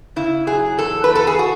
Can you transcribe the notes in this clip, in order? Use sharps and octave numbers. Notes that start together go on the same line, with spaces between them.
C#3 E4
F#3 G#4
E2 A4
B4
E2
A4
G#4
F#4